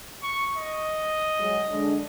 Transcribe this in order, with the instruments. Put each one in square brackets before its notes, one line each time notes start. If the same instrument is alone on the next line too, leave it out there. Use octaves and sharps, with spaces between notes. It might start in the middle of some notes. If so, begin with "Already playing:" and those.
[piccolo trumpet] C#6
D#5
[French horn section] F#3 G#3
D3 G#3 D4